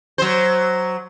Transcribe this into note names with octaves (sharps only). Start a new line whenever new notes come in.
F#3 C5